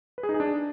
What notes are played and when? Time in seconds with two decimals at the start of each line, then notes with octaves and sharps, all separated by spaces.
0.18 B4
0.23 G#4
0.29 D#4
0.34 G#4
0.40 D4